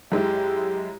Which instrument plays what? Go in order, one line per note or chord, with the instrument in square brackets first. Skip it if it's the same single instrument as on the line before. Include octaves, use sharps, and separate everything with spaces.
[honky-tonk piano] F#2 G#3 E4 [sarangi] G4